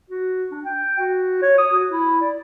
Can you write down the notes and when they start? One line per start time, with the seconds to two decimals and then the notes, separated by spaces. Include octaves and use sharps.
0.10 F#4
0.51 D4
0.65 G5
0.99 F#4
1.42 C#5
1.58 D#6
1.71 F#4
1.90 E4
2.21 D5